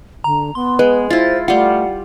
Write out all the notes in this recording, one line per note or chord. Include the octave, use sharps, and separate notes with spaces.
D3 A#5
B3 C6
G#3 B4
E4 F4 C5 A6
G3 A3 F4 F#5